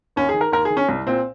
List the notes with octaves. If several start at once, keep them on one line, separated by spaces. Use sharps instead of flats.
D#2 C#4
G#4
D#3
A#4
D#2 A#4
G#4
D#3
C#4
C2
A#2 C4